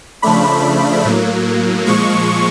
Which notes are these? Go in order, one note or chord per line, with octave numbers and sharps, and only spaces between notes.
C#3 F3 A3 D4 B5
A2 F#3 A#3
A#2 F3 G#3 C#6